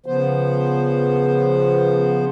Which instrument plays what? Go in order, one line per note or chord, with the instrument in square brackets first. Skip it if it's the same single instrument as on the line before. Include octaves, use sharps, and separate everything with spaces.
[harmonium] C#3 F3 B3 C5